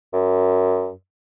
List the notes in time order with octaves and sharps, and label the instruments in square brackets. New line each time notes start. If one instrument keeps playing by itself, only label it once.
[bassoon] F#2